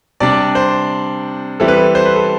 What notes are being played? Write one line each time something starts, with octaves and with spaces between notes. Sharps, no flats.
C3 G3 D4 D5
C5
E3 G3 C4 E4 A4
B4
A4
C5
B4
A4